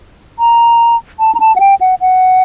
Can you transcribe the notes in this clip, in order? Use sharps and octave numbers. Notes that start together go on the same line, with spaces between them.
A#5
A5
A#5
A5
F#5
G5
F#5
F#5